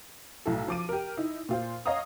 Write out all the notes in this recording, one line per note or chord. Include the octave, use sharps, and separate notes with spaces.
B1 A2 E4 A4
F3 D6 D#7
G4 A#4
D#4 E4
A#2 F4 C5
C#5 D#5 F5 F#5 A#5 D#6